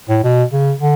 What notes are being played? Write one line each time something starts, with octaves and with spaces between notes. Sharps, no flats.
A2
B2
C#3
D3